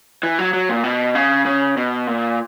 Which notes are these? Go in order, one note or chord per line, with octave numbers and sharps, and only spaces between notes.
E3
F#3
F#3
A#2
B2
C#3
C#3
B2
A#2